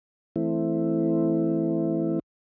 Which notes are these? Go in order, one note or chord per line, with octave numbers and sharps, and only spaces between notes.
E3 A3 C4 E4